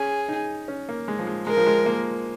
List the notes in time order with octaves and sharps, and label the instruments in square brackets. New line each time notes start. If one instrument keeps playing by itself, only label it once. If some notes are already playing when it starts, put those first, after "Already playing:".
Already playing: [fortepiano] C#4 [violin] G#4
[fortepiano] D#4
C#4
A#3
G#3
F3
G#3
[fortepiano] G#3 [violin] A#4
[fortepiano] F3
G#3
A#3